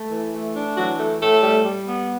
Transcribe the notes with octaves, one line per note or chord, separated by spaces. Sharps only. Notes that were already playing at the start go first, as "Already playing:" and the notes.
Already playing: A3
E3
A3
D4
E3 F#3 F#4
A3
A2 A3 A4
G3
G3
B3